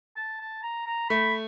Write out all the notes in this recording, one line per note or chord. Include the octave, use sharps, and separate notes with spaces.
A5
A5
A#5
A#5
A3 B5